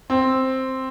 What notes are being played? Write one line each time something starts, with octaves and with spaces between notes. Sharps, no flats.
C4